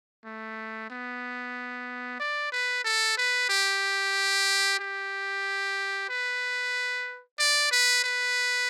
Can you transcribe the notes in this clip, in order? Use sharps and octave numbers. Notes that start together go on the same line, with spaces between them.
A3
B3
D5
B4
A4
B4
G4
G4
B4
D5
B4
B4